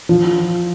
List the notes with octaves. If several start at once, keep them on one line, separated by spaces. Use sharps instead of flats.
F3